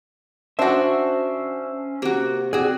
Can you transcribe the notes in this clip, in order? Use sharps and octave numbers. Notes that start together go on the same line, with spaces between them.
C#4 D4 F#4 C5 E5
C3 A#3 F#4
C4 F#4 G#4 D5